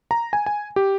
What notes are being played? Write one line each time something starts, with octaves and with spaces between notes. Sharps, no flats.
A#5
G#5
G#5
G4